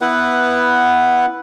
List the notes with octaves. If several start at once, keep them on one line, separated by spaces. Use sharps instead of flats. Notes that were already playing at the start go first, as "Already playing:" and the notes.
B3 E4 B4 F#5